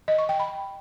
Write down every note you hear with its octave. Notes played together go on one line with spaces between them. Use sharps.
D#5
C#6
G5
B5